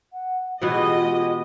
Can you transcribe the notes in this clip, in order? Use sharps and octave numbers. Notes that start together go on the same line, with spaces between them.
F#5
B2 E3 G#3 B3 F4 G4 D#5